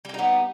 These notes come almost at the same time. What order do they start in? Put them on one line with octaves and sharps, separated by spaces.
G3 G4 D#4 B3